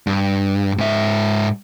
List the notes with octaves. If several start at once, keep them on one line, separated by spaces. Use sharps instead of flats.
G2
G#2 E5